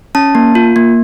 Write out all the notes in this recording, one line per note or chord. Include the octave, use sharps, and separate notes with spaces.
C#4 A5
A#3
F4
A#3